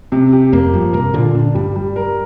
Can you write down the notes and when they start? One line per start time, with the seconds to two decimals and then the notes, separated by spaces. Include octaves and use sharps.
0.12 C3
0.33 G4
0.53 F2 A#3
0.73 G2 F3
0.93 G2 C3 A#4
1.14 A#2 D3 F4
1.35 D4
1.54 G2 G3
1.76 G3
1.96 A#4